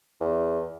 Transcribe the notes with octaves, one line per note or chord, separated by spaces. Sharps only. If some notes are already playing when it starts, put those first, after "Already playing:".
E2